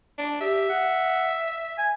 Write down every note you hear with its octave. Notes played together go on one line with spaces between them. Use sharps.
D4
G4 E5
F#5
G#5